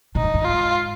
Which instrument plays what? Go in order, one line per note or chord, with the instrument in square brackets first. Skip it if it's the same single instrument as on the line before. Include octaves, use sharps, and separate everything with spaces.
[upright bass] A#2 [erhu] D#4
[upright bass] G#2
G2
[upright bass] G#2 [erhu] F4